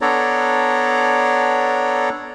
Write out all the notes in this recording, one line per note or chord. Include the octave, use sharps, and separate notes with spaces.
B3 D4 A4 C#5 D5 A#5